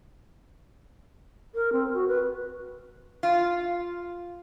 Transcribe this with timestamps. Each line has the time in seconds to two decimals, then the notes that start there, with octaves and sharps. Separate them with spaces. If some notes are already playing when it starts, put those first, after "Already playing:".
1.55 A#4
1.73 C4
1.94 F#4
2.08 B4
3.23 F4